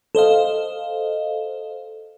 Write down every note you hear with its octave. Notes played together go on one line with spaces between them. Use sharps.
A4 C5 D#5 F5